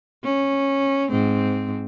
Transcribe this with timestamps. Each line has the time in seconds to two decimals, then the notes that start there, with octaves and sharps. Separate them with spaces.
0.24 C#4
1.11 G#2 C4